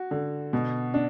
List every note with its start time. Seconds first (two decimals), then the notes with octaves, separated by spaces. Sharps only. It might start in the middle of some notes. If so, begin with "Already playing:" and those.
Already playing: F#4
0.11 D3
0.53 B2
0.94 D4